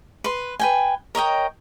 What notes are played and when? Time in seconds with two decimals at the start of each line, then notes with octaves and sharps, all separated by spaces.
0.24 B4 C6
0.60 B4 G5 G#5
1.15 A#4 C#5 D#5 G5